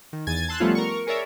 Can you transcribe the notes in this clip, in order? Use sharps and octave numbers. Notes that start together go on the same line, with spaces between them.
D#3
E2 G#5 G#6 A6
A5 C6 E6 F#6
F3 G3 A3 B3 C#4 F4
A#4 C#6
G#4 A#4 C#5 D5 E5